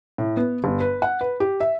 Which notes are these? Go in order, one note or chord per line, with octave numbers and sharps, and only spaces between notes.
A2
B3
G1
B4
F#5
B4
G4
E5